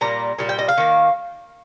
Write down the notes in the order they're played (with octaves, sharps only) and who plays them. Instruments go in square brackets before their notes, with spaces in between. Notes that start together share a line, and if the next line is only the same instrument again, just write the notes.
[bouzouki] A#2 G3 A#3 A#5
A#2 G3 A#3
G5
D#5
F5
D#3 A#3